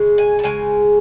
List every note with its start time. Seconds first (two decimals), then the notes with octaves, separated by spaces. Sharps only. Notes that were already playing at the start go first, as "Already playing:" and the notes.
Already playing: C#3 G#3
0.18 G#5
0.39 A5
0.43 C#3 G#3 G#5